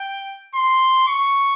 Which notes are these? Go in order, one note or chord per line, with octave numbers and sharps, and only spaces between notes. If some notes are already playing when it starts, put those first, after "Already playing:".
Already playing: G5
C6
C#6